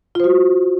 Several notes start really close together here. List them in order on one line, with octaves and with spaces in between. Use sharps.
F4 C5 F#4